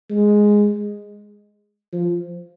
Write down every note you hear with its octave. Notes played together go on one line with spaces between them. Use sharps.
G#3
F3